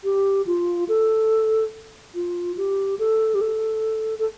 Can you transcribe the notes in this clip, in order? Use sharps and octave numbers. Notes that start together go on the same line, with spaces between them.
G4
F4
A4
F4
G4
A4
G4
A4
A4